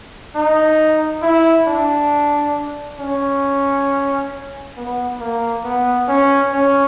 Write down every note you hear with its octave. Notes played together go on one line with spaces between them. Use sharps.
D#4
E4
D4
C#4
B3
A#3
B3
C#4
C#4